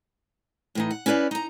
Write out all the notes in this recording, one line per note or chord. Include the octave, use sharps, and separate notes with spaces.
A2 E3 D#4
F#5
C#4 E4 B4 D5 F5
D#4 A#5